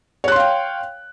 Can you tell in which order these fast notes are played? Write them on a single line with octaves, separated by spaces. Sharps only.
C#5 F#6 C6 F5 G5